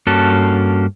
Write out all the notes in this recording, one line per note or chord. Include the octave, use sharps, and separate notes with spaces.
G2 A#3 C#4 F#4 A4 A5